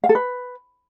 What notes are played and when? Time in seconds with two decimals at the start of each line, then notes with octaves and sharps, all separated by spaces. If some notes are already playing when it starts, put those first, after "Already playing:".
0.04 F5
0.09 A4
0.15 B4